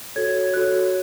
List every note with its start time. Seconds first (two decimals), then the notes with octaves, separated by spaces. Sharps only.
0.16 F#4 A4 C#5 G#6
0.54 F#4 A4 C#5 F#6